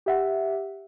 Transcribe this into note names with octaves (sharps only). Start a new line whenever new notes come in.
G4 E5 F#5